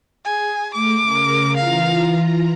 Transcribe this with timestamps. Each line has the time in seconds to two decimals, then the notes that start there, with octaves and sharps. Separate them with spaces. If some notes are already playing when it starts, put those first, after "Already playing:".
0.25 G#4 G#5
0.74 A3 D6
1.03 C#3 A#4
1.56 E3 F4 F5 A#5